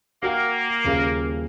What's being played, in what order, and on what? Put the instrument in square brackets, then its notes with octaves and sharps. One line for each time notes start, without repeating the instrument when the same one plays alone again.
[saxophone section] A#3 [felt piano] F#4 F5 G5
[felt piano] D#1 C#3 F5